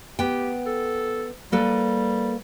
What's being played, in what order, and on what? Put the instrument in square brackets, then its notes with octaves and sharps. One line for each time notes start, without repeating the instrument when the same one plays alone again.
[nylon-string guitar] B3 G5 [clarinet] G4
[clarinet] A4
[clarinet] G3 [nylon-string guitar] A#3 A4 B4